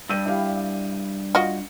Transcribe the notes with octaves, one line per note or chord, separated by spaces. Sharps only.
G2 E6 G6 D#7
E4 G4 F5
F4 F#4 D#5 C#7